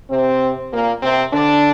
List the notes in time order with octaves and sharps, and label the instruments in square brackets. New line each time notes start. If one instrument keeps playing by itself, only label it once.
[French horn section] C3 C4
A#2 A#3
C3 C4
D3 D4